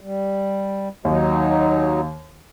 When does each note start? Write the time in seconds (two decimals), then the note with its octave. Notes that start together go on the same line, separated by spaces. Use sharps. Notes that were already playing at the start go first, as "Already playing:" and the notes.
0.01 G3
1.05 D#2 F#3 D#4